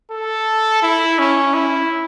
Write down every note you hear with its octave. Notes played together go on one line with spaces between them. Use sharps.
A4
E4
C#4
E4